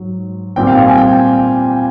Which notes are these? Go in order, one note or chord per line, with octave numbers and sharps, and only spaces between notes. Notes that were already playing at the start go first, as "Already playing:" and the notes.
Already playing: G#2 F#3
A#2 G3 C4 G5
F5
G5
G#5
G5